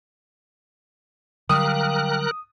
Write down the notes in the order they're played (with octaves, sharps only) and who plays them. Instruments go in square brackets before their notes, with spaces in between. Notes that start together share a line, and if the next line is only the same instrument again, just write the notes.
[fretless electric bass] D3 F#3 G3 [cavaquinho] G4 F5 [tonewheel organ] A#4 F#6 [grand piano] D#6